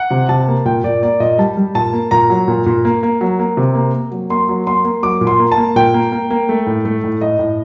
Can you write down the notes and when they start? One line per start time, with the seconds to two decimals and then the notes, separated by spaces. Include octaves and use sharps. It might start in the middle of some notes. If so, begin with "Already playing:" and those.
Already playing: F#5
0.10 C3
0.29 C3 A5
0.48 A#3
0.65 A#2 G5
0.84 A#2 D5
1.02 A#3 D5
1.20 A#2 D#5
1.38 G3 A5
1.57 G3
1.75 A#2 A5
1.93 A#3
2.11 A#2 A#5
2.30 F#3
2.48 A#2
2.66 A#2
2.85 A#3
3.03 A#3
3.21 F#3
3.39 A#3
3.57 C3
3.75 A#3
3.94 A#3
4.11 F#3
4.30 A#3 C6
4.49 F#3
4.67 A#3 C6
4.84 A#3
5.03 F#3 D6
5.21 A#2
5.27 C6
5.39 A#3
5.52 A5
5.57 A#3
5.76 A#2 G5
5.94 A#3
6.12 A#3
6.30 A#3
6.49 A3
6.66 A2
6.85 A3
7.04 A2
7.21 A2 D#5
7.39 A2